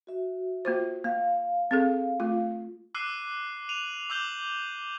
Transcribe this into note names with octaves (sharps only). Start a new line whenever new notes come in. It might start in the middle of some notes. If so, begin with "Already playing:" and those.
F#4 E5
A#3 F4 C5
A#3 F5
C4 G#4 A4
A3 F4
D6 E6 F#6 C7 D#7
D#7 F7 F#7
D6 E6 G6 F#7 G7